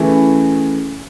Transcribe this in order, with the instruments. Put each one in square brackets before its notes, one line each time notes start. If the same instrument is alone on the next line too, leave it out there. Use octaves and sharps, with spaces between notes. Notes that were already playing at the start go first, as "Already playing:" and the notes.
Already playing: [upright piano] C#3 E3 A3 E4 G#4